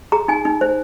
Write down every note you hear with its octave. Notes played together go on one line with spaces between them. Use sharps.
G#4 A#5
D#4 G#5
D#4
C5